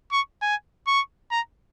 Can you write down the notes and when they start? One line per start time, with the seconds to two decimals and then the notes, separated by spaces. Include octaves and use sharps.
0.12 C#6
0.42 G#5
0.87 C#6
1.31 A#5